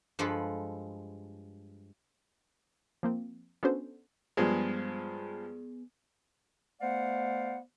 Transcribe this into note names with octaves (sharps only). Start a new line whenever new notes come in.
G2 F3 G#3 A4 B4
F3 A#3 C4
B3 C#4 D4 F#4 A4 C5
G2 F3 G#3 B3 G#4
A3 B3 C5 D5 F5 F#5